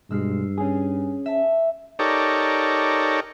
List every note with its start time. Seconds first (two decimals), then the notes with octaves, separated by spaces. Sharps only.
0.11 B1 G2 G#3 E6 F6 C7
0.58 C#4 G#4 D#6
1.26 E5 A5
1.99 D#4 G4 A4 A#4 C#5 D5